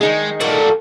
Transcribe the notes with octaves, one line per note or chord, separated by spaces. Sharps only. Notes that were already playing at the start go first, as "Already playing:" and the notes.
D#3 G#3 D#4 G#4
A#2 G3 A#3 F#4 A4